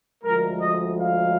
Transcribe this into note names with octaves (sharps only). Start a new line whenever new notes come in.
D2 D3 F3 G#3 A#4
D#5
F5